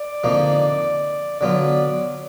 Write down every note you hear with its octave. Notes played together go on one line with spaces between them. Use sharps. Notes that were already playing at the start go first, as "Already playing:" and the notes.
Already playing: D5
F2 D3 F3 A#3 D#4
D3 F#3 B3 F4 D5